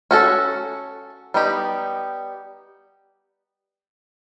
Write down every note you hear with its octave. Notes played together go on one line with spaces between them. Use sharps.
C#4 F#4 A4
G3 B3 D#4 G4